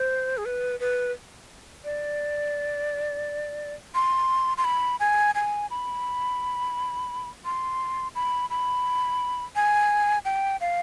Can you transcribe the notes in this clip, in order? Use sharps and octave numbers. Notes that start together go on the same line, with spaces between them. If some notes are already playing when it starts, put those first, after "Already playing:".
Already playing: C5
G#4
B4
B4
D5
C6
C6
B5
G#5
G#5
B5
C6
B5
B5
G#5
G5
F5